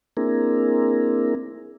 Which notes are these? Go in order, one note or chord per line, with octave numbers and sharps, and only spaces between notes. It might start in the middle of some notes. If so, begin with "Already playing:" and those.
A#3 C4 D4 E4 G#4 A#4